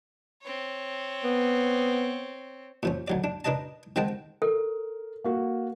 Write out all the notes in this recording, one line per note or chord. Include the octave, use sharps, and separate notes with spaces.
C4 C#5
B3
A#2 F3 C#4
D2 F#3 D5
D4
D4 A#4 B4 D#5 A5
D#3 G#3 C4 F#5 G5 A5
A4 A#4
A#3 F#4